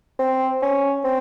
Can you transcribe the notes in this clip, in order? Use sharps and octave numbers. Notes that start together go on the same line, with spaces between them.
C4
C#4
C4